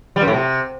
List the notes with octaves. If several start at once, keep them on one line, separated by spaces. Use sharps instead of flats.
G3
F#2
A2
C3